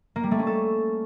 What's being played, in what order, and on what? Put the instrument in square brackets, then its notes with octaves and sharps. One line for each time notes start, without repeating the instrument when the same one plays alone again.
[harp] A#3
G3
A3
C#4
A4